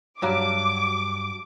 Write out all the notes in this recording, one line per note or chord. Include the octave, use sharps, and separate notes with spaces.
G2 F#3 A#5 D6